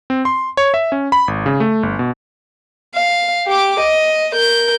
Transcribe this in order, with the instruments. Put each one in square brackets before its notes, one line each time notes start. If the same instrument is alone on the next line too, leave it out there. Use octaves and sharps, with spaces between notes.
[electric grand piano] C4
C6
C#5
E5
C#4
B5
G#1
C#3
A3
G1
B2
[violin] F5
G4 D6
D#5
A#4 G6